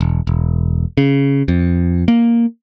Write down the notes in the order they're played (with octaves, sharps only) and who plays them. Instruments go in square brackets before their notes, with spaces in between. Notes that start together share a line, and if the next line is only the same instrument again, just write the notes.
[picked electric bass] E1
E1
C#3
F2
A#3